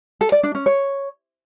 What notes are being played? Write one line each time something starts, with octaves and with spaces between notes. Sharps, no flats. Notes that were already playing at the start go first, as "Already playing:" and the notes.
A4
D5
D4
C#4
C#5